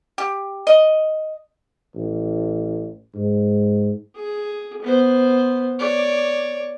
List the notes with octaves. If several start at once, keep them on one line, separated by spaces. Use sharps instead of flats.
G4
D#5
A1
G#2
G#4
B3 C5
C#5 D5